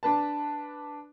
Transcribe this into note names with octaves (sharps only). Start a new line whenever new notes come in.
D4 B4 A5